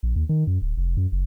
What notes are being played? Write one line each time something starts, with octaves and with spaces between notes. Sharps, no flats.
A#1
D#2
D#3
F#2
D1
F1
F#2
F#1